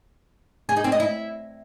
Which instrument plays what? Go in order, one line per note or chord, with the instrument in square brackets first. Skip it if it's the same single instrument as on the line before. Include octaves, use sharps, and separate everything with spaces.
[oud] G#4
D#4
C4
D#5
E4